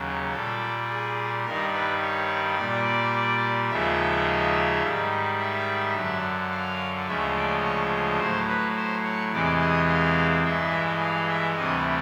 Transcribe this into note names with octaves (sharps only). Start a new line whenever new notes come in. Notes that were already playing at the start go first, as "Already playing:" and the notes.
Already playing: D#2 C#3 F#3
A#2 G3 A4
G#4
G2 D#3 G3 A#4
B4
C#5
A#2 G3 D5
D#2 C#3 F3 G#3 E5
G#2 D#3 G3
E5
F#2 D3 F#3
F5
D2 C#3 F3 G#3 E5
D5
C#5
A2 F#3 C5
B4
C5
C#5
E2 C3 E3 G#3 D5
D#5
F5
G2 E3 G#3 E5
F5
E5
D2 C3 E3 G3 D#5